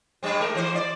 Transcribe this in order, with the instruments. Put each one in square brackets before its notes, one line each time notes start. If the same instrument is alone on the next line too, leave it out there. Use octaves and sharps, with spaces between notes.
[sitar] G2 G3 C4
G#3 A#4
E3 C5
D5